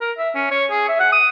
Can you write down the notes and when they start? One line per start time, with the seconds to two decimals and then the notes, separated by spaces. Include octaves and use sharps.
0.01 A#4
0.18 E5
0.35 C#4
0.51 C#5
0.71 G#4
0.89 E5
1.00 F#5
1.12 D#6